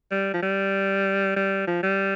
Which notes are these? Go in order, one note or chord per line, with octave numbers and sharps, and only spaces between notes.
G3
F3
G3
G3
F3
G3